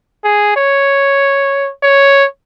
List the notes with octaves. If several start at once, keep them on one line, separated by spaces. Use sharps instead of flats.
G#4
C#5
C#5